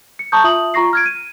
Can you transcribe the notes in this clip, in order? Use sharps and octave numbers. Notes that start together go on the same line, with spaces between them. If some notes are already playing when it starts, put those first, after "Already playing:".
C#7
A5 A#5 C#6 D#6 G6
F4 E5 D#6 F#7
F4 A#5 C#6 A#6 C7
F6 G#6 D7
D#7